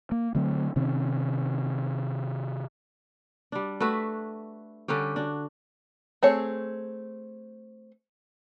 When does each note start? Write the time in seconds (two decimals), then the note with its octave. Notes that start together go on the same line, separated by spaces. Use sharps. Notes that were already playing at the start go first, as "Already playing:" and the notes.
0.12 A#3
0.35 D3 F#3 A3 C4
0.76 C3 D#3 C4 C#4
3.52 G3 D4
3.80 A3 F#4 B4 E5
4.88 D3 G3 C#4 G4
5.16 D4 F#4
6.23 A3 C4 G#4 C#5